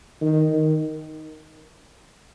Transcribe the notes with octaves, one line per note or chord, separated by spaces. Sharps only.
D#3
D#3